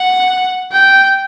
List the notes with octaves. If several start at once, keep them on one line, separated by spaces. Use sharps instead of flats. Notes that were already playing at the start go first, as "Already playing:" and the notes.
Already playing: F#5
G5